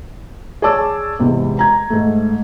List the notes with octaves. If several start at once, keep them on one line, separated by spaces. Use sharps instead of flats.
G#4 C#5 D5 A5 D6 E6
E2 G#2 C3
A#5 G#6
G#2 A3